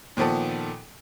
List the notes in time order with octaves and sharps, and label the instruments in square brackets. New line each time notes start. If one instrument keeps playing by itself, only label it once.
[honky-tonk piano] A#2 D#3 F3 B3 A4